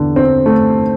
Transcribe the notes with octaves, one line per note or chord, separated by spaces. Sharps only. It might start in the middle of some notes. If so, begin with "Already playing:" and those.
Already playing: E2 D3
C4
A3